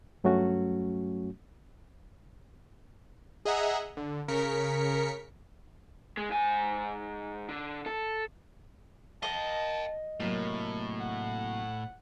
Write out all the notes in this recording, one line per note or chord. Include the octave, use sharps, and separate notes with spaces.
G2 F#3 A3 C#4 F#4
G#4 D#5 E5 F#5 A#5
D3
C#3 A#4 B6 C#7
G#3
G#2 G#5
D3
A4
A#4 D#5 F5 G5 A5
A2 C3 F#3 A#3 A#4
F#5